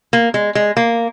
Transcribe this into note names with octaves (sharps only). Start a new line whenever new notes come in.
A#3
G#3
G#3
A#3